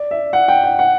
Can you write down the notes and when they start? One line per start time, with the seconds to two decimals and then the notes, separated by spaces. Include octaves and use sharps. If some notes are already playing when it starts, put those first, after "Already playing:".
Already playing: D5
0.11 E5
0.33 F#5
0.48 G5
0.64 F#5
0.79 F#5